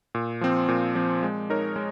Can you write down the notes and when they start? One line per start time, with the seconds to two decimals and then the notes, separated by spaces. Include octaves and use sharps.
0.15 A#2
0.41 F3 C4
0.69 A#2
0.95 F3 C4
1.23 G#3
1.50 D#4 A#4 C#5
1.76 G#3